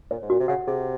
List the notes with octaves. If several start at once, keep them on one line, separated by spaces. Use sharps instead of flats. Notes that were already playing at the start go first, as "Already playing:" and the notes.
A#2 C#5
G#2
A#2 F#4
C3
C#3 F#5
C3 G#4